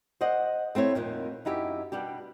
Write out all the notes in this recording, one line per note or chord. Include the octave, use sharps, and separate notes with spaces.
C5 D5 D#5 F#5
A3 C4 E4 C#5
F2 A#2 D#3
F#2 D#4 E4 G4
B2 G3 D4 G4